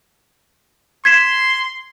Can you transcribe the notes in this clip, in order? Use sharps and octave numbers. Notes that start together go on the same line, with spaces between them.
C6 G#6 B6 E7